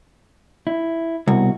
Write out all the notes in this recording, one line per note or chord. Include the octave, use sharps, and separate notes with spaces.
E4
C2 B2 F#4